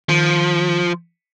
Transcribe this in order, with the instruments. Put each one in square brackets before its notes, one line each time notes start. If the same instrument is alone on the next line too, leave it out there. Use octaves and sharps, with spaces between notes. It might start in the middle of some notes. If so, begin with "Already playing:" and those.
[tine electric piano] D#3 [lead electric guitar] F3